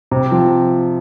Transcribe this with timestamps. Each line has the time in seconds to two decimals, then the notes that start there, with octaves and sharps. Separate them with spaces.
0.11 C3
0.31 F3 C4